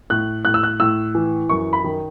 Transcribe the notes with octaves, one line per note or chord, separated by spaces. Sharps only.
A2 F#6
A2 F#6
E6
F#6
A2 E6
E3
F#2 C#6
B5
D#3